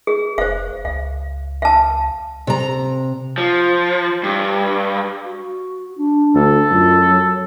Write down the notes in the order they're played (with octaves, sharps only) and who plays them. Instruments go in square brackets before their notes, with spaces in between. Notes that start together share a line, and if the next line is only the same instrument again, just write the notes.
[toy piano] G#4
[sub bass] F1 [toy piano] C5 F5
[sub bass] C#2 [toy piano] F5
[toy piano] F5 A5
[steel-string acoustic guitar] C3 A#5
[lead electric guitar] F3
G2
[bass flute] F#4
D4
[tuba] D2 [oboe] A4
[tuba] F#2 [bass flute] F4
[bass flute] F#3